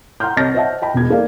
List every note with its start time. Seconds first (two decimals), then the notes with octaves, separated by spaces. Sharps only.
0.20 F#5 A#5 C6 F6 G6
0.36 C2 C#5 D#5 A5 F6 A#6
0.54 C5 C#5 D#5 E5 F#5 A5
0.82 D#5 G5 A5 B5
0.94 E1 E2 B2 G#6
1.10 A#3 A4 A#4 D5 F5